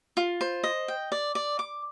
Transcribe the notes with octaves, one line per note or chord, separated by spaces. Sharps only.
F4
C5
D#5
G5
D5
D5
D6